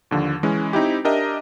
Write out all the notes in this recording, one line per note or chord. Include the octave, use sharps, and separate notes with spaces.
D#2 D3 F3
E3 G#3 C#4
C4 D#4 E4 G4
D4 G4 A#4 D#5 E5 A#5